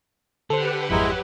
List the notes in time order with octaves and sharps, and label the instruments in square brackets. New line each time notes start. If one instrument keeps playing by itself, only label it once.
[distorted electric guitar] D3 [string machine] G4 B4 F#5 [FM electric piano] A4 C5
[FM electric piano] G#1 F2 A#5 [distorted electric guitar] F#3 [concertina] G#3 E4